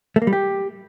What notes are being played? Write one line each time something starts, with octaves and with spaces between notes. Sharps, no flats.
A3
A#3
G3
G4